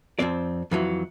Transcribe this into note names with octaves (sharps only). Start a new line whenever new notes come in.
F2 A#2 C4 D5
F2 E3 F#3